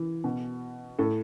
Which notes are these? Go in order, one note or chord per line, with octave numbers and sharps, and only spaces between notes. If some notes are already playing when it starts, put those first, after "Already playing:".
Already playing: E3
B2
A2 A4